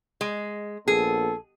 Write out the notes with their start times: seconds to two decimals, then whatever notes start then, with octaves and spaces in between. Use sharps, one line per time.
0.21 G#3
0.88 A#1 B3 G#4 A4